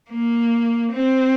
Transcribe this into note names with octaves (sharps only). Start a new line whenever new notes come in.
A#3
C4